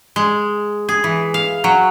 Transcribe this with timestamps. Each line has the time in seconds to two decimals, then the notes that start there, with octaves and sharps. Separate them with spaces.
0.16 G#3
0.89 G#4
1.04 E3
1.34 F5
1.64 F#3